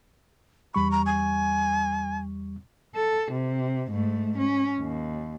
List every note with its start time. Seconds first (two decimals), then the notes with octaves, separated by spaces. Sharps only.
0.74 E2 G3 B5 C#6
0.91 A#5
1.06 G#5
2.95 A4
3.31 C3
3.91 G#2 A3
4.38 C#4
4.80 D#2